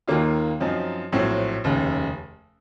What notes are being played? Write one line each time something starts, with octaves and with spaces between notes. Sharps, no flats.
D#2 D#3 A#3 F4
F#2 F3 C4 D#4
A#1 A2 F#3 C4
F1 D#2 C#3